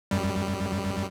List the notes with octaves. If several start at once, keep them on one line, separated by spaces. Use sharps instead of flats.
F#2 G3